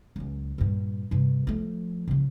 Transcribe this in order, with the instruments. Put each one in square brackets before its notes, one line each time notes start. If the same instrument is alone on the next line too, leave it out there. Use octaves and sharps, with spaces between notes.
[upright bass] C#2 F#3
G2 A#2
G2 C3
F3 A3
C#3 F3